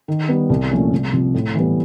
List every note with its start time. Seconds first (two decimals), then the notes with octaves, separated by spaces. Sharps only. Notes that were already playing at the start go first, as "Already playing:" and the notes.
0.08 D#3
0.28 G3 B3
0.50 C2
0.71 A#2 F3 A3 C#4
0.92 C2
1.13 C3 F3
1.34 A2
1.55 E3 G3 B3